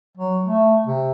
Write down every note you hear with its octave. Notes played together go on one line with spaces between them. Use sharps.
F#3
A3
C3